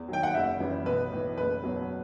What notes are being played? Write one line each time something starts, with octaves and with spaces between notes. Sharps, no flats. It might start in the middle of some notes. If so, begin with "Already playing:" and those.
Already playing: E2
D#3 F#3 G5
F#5
F#1 E5
F#2 E3 G3
B1 B4
A2 E3
F#1 B4
E2 B2 F#3